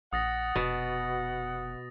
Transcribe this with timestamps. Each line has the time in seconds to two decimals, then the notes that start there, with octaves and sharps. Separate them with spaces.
0.13 A#1 F#5 D#6 A6 A#6
0.56 F1 B2